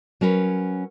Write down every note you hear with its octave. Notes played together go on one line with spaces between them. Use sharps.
F#3 C#4 A#4 B4